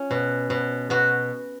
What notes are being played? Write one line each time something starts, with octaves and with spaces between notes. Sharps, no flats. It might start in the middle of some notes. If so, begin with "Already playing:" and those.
Already playing: C#4 F4
B2
B2
B2 F#4